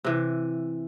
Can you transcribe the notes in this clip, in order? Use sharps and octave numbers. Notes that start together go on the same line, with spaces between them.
C3 E3